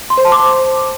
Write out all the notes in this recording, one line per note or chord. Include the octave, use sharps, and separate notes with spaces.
C6
C5
A5
D6